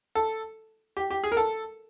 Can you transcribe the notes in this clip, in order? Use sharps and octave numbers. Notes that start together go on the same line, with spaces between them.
A4
G4
G4
G#4
A#4
A4